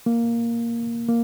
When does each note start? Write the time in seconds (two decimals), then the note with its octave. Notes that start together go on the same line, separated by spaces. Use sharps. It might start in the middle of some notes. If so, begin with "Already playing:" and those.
0.06 A#3
1.08 A#3